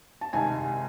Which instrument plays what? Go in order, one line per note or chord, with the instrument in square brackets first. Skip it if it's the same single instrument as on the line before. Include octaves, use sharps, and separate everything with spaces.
[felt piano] A5
[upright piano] C2 C3 D#3 G#3 C4 [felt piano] G#5